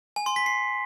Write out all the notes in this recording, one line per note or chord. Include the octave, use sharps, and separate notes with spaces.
G#5
C6
B6
C7